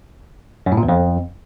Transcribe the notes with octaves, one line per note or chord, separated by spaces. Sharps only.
F#2
A2
A#2
E2
F2